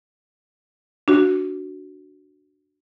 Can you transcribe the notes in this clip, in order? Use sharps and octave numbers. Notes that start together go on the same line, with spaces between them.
D4 F#4